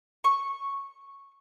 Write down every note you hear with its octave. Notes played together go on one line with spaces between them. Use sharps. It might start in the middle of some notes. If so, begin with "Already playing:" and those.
C#6